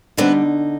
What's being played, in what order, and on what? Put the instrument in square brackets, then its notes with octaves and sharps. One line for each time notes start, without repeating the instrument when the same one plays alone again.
[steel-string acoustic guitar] D3 G3 B3 C4 D#4 B4